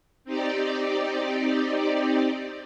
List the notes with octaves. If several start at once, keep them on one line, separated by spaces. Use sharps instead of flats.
C4 D#4 G4 D5